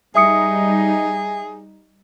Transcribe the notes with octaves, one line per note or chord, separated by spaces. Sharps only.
G3 D#4 G#4 E5 D#6 C#7